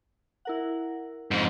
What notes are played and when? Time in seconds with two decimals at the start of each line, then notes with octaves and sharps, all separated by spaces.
0.45 E4 A#4 F#5
1.31 F2 G#2